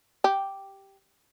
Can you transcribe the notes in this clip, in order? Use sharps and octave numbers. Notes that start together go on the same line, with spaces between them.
G4